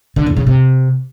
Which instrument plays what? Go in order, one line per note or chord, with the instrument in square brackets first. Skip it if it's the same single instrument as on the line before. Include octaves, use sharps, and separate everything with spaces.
[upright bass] D3
E2
C#3
C3